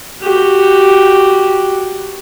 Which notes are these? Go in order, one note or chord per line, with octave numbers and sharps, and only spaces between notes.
F#4 G4